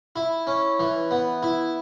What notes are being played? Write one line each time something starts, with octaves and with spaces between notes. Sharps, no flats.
E4
C#4
E3
B3
E4